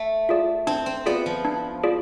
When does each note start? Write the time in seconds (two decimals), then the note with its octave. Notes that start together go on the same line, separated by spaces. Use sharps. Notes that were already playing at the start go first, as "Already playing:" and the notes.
Already playing: A3
0.29 F4 G#4 D5
0.67 C4 D4
0.86 C4
1.06 B3 F4 G#4 D5
1.26 F3
1.45 D4
1.84 F4 G#4 D5